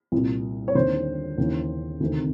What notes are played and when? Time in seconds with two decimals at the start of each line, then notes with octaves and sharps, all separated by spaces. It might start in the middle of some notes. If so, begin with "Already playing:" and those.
0.12 C2 A#2
0.68 C#5
0.75 D#2 D3 C5
1.38 D#2 C#3 E3
2.00 D2 C3 D#3